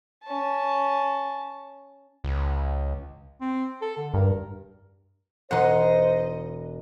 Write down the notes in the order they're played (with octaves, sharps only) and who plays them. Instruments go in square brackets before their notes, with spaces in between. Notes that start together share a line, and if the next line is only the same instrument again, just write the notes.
[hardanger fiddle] C#4 A5
[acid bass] C#2
[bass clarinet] C4
A4
D3
[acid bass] G2 [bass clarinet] A#4
[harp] E1 C6 C7 [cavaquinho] D#4 F#5 [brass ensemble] C5 [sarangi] D#5